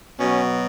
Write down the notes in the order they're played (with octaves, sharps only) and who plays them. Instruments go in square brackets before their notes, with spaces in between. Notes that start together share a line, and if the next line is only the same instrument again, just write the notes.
[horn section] B2 F#3 C#4